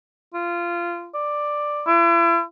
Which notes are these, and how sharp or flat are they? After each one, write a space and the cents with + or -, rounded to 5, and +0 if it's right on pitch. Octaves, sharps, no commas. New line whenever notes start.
F4 -20
D5 +10
E4 +40